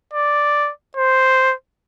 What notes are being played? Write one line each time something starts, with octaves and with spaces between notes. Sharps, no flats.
D5
C5